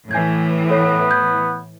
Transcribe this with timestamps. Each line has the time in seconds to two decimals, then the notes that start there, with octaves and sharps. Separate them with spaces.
0.11 A2 E3 G#5 G6 G#6
0.70 B3 A4 C#5
1.11 G6 G#6